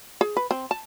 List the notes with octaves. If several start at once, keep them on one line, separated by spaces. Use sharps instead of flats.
G#4
B4
C4
A5